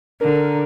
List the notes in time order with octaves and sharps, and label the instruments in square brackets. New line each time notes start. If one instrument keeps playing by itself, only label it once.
[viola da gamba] D3 [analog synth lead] A#4